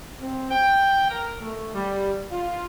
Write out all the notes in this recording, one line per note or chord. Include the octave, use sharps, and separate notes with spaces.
C4
G5
A#4
A3
G3
F4